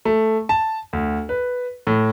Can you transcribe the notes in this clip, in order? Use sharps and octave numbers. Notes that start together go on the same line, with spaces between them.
A3
A5
D2
B4
A2